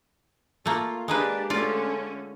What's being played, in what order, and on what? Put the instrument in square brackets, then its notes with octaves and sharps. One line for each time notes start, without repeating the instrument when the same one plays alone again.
[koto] A3 A#3 [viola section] F4
[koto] G#3 A#3 B4 [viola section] D4 G4
[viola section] D3 A3 C#4 [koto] F4 D5